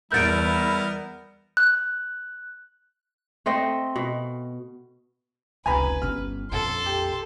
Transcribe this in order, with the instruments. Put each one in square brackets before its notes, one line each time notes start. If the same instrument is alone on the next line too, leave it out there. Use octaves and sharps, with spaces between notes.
[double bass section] E2 [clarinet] G3 [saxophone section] B3 E4 A#4 [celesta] G6 A6 D7
[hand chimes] F#6
[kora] A3 C4 D#5 G5
B2
[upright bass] F1 C#2 [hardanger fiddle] B4 [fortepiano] G#5 A#5 B5
[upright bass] G1 C#4 [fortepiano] F6
[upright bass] A#1 F2 [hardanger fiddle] A4 C6
[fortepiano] G4